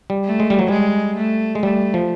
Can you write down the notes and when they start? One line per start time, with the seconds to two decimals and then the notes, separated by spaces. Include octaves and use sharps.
0.10 G3
0.25 A3
0.40 G#3
0.50 G3
0.59 F#3
0.68 G3 G#3
1.17 A3
1.55 G#3
1.63 G3 A3
1.94 F3